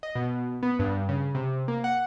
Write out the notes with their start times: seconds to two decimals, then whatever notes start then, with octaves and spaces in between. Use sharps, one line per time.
0.03 D#5
0.15 B2
0.63 B3
0.79 G2
1.09 C#3
1.35 C3
1.68 A#3
1.84 F#5